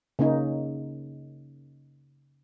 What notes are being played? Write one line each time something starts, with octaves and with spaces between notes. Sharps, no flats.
C#3 A#3 C#4 D#4